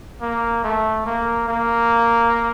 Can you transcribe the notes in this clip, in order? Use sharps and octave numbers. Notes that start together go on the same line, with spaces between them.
A#3
A3
A#3
A#3